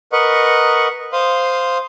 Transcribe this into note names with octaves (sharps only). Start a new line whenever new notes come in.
A#4 B4 D#5 F#5 C#6
C5 F5 C6 D#6